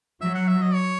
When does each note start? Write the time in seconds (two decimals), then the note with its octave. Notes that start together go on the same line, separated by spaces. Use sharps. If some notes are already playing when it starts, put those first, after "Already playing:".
0.21 F#3 E5
0.35 F#5
0.48 E5
0.61 D#5
0.74 C#5